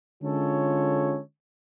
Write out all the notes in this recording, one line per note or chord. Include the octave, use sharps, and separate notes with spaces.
D3 G#3 C#4 F4 A4 C#5